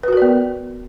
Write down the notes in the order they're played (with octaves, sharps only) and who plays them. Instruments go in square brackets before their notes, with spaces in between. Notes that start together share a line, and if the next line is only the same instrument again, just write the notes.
[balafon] B4
F#4
A#4
D5
B3